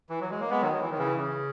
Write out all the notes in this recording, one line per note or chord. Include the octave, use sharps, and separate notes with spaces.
E3
F#3
G#3
A#3
G#3 B3
D#3 F#3
F#3
E3
D#3
C#3 E3
C#3